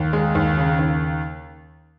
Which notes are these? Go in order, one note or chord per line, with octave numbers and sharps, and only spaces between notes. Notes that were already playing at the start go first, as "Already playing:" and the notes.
Already playing: D#2
G#3
D#2
C#3
D#2